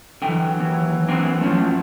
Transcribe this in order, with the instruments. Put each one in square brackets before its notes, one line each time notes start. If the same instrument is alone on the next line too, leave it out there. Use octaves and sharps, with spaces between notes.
[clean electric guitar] D3 G5 [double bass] E3 F#3
[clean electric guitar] D#2
A#3 C4 D4
[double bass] F3 F#3 [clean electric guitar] A3 C#4